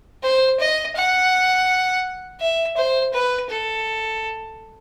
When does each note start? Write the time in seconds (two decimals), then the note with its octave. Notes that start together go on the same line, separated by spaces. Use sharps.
0.23 C5
0.60 D#5
0.96 F#5
2.41 E5
2.77 C5
3.13 B4
3.50 A4